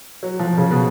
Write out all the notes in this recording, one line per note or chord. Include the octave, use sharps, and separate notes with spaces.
F#3
F3
C#3
B2